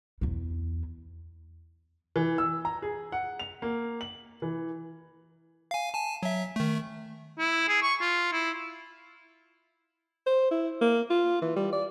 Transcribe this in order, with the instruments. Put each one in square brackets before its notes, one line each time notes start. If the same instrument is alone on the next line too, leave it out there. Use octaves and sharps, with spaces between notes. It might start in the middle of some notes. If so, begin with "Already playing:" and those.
[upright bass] E2 E4
[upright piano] E3
E6
A#5
G#4
F#5
F7
A#3
F#7
E3
[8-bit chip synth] F5 G#5
G#5 A5
F#3 E5
D#3 A3
[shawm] E4
G#4
C#6
F4
E4
[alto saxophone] C5
E4
A#3
F4
E3
G3
D5